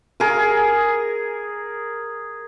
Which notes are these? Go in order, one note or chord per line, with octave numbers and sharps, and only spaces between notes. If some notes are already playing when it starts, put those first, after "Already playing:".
G#4 A#4